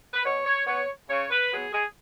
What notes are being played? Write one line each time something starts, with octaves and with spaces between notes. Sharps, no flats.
B4
B2 C#5
C#5
B3 C#5
C#3 C#5
B4
F#3 B3 G#4
G#4